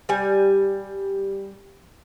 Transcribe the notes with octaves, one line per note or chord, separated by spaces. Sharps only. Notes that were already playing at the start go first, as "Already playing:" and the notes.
G3 G#5